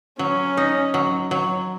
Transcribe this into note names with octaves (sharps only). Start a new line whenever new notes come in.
F#3 C#4
D#4
F#3
F#3